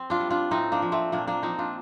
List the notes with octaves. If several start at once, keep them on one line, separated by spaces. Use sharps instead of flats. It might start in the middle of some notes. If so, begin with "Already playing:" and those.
Already playing: C4
D4 F4
G3
D4 F4
A2 C4 D#4
A#3 D4
F3
A3 C4
A#2 A#3 D4
A#3 D4
F3 C4 D#4
D4 F4